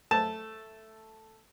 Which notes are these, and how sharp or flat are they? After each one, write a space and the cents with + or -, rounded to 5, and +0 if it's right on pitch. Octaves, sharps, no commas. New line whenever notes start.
A3 +0 A5 +0